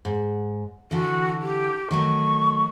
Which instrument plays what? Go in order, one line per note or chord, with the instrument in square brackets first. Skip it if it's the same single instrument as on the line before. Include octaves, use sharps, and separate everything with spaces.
[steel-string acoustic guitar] G#2
[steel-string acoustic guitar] D3 E3 [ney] F#4
[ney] G4
[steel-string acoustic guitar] D#3 F#3 A3 [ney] C#6